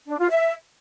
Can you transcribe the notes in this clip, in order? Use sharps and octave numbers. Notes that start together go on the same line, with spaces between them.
D4
F4
E5